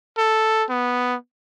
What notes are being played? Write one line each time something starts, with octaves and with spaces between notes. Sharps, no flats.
A4
B3